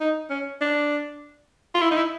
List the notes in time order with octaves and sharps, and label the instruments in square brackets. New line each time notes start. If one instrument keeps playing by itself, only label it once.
[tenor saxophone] D#4
C#4
D4
F4
E4
D#4
E4